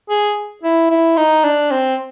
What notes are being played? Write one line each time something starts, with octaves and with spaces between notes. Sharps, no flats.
G#4
E4
E4
D#4
D4
C4